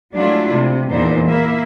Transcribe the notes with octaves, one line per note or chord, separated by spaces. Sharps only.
F#3 G#3 A3 D4 E4 F4
C3
E2 A#2 E3 D4 D#4 C5
A#3 E4 E5